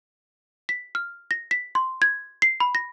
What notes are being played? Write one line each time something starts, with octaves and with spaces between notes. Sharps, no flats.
B6
F6
A#6
B6
C6
G#6
C7
B5
A#6